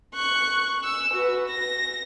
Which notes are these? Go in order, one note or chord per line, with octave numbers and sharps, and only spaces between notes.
C#6 F#6
E6
F#4 B4
A#6